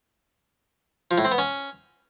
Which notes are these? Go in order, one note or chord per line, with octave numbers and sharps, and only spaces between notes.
F3
A2
C4
B3
C#4